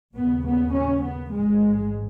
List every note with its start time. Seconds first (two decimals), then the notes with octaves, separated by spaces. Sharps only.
0.14 D#2 C#3 B3
0.44 B3
0.73 C#4
1.02 B3
1.31 A1 G#2 G#3